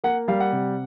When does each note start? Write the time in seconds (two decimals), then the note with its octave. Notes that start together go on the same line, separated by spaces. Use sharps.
0.04 A#3 F#5
0.28 G3 F5
0.40 F#5
0.52 C3